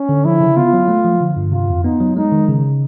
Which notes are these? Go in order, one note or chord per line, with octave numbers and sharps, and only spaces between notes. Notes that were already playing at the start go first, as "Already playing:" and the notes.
Already playing: C#4
D3
F3 E4
C#3
B3 F4
F#3
A3
F3
D3
G2
C3 F4
F2
B3 D#4
F#3
G#3 D#4
D#3
C#3